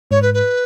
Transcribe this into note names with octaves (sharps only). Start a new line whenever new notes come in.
G#2 C#5
B4
B4